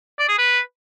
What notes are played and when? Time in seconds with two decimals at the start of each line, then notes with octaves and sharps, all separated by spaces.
0.19 D5
0.28 G#4
0.38 B4